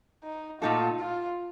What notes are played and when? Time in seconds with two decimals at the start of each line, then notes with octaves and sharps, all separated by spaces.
0.23 D#4
0.61 A#2 A3 D#4 F4 F#4 A4
1.00 F4